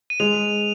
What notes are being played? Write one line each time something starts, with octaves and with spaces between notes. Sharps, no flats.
D#7
G#3 F7